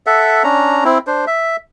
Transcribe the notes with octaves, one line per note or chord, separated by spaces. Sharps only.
A4 E5 F#5
C#4 D4 A#5
C4 E4
D4 C5
E5